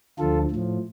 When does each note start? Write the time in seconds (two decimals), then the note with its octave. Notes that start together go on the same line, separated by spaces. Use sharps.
0.18 D2 D3 F3 F4 A4
0.51 A2 F3